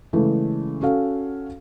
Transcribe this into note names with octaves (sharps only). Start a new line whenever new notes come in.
C#3 E3 G#3 A3
C#4 F#4 A4 F5